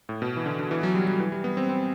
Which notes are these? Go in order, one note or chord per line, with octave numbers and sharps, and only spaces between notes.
A2
B2
E3
D3
D3
E3
F#3
G3
F#3
E3
G3
B3
C4
C4